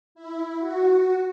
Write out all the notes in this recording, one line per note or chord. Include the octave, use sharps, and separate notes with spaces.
E4
F#4